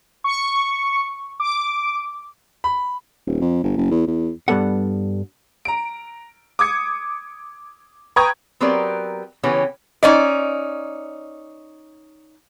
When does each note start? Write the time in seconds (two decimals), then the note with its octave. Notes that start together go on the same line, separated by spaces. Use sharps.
0.24 C#6
1.40 D6
2.64 B5
3.27 D#1
3.41 F2
3.64 G1
3.77 F#1
3.91 E2
4.07 E2
4.48 G2 E3 G3 B3 A4 F#5
5.65 A#5 D7
6.59 D6 D#6 G#6 C#7
8.16 B4 G5 A#5 C#6 D#6 G#6
8.61 F#3 B3 C4 G4 A#4 D5
9.43 C#3 E3 B3 C#4 G4
10.03 C#4 D#4 D5 D#5